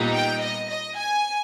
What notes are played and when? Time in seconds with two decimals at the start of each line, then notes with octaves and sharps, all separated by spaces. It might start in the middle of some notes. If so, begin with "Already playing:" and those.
Already playing: A#2 G3 B3 D#4
0.14 G5
0.42 D#5
0.70 D#5
0.98 G#5